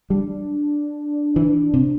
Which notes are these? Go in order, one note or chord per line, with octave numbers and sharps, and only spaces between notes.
G3 D4
E3
C3